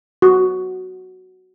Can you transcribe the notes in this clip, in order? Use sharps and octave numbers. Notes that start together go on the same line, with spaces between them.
F#4